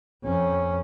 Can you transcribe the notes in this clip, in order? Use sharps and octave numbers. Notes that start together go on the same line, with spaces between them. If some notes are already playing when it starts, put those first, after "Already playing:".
F2 C#4